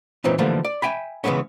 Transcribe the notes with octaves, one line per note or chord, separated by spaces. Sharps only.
A#2 E3 C4 C#4 D#4
D3 E3 F3 G3 A3 A#3
D5
E5 G5 G#5 B5
C#3 E3 F3 G#3 B3 C#4